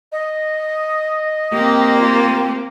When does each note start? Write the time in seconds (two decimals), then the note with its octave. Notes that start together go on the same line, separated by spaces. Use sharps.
0.12 D#5
1.53 A#3 C4 G4
1.99 F4